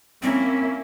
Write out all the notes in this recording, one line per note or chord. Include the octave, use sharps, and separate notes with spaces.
A#3 C4 C#4 E4